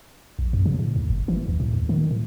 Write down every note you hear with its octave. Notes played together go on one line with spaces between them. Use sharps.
A#1
F#2
C#3
A2
D#2
G1
E3
D2
A2
D#2
D#3
A2